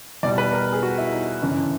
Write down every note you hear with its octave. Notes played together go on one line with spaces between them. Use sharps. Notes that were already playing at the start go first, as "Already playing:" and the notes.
E2 B2 G3 D5
B4
A#4
G#4
F#4
E4
D#4
G1 F#2 C#3 E3